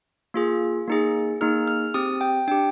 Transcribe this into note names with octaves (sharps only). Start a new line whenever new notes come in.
A#3 F4 G#4
A#3 D#4 G#4
A#3 D#4 G#4 F6
F6
C4 G4 D#6
G5
D4 G4 G5